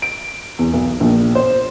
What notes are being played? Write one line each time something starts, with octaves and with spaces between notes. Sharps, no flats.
D7
E2
B1
A#1
C5